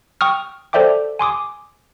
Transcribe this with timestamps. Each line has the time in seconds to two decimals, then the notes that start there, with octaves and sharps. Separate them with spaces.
0.21 G5 C#6 D#6 F6
0.73 A4 C5 D5 E5 G5 D6
1.19 G#5 C6 D6 D#6